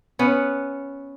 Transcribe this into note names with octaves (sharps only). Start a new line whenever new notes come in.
B3 C#4 F#5